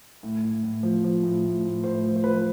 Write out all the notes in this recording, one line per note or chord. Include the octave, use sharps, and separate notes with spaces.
A2
A2
A2
F3
F3
A2
A2
A2
A2 C5
F3
C5
F3 B4